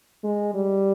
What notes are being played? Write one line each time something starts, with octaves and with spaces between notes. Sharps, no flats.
G#3
G3